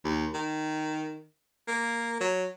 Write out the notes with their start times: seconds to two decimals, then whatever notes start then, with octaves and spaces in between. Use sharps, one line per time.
0.04 D#2
0.34 D#3
1.68 A#3
2.20 F#3